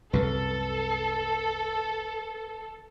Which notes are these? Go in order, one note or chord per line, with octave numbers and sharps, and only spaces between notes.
C2 F#2 C#3 A4 B4